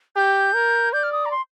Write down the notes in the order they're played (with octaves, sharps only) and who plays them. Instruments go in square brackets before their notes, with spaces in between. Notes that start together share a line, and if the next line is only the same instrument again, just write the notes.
[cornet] G4 [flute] G6
[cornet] A#4
[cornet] D5 [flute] G6
[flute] F6
D#6
A#5
C6